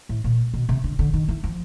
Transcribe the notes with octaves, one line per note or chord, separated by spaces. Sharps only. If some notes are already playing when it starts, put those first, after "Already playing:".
A2
A#2
B2
C3
D3
D3
D#3
E3
F3